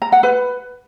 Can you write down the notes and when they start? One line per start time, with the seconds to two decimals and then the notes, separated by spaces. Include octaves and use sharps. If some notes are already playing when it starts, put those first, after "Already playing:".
0.02 A#5
0.12 F#5
0.23 B4